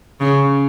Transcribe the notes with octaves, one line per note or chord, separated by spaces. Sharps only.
C#3